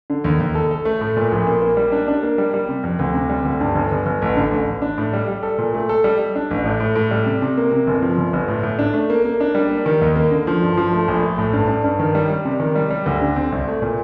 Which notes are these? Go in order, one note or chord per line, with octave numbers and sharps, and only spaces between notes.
D3
D#2
D#2
A4
A4
A3
A2
A#2
A#1
A#3
A#3
G3
D4
D4
A#3
G3
G3
C3
F2
D2
C3
G3
D2
G2
G1
G1
G1
A1
D3
A1
A1
D4
A2
G3
G3
A4
A#2
A3
A4
G3
G3
D4
A1
A2
A2
A2
G3
C3
C3
A#3
C3
G1
F3
G1
G1
A2
A2
D4
A3
A#3
A#3
D4
G3
A#3
D#3
D#2
A#3
D3
F3
G2
F3
A3
A#1
A3
A2
G2
G2
G2
D#3
G3
G3
C3
D#3
G3
G3
D2
D3
C4
C2
A3
A#2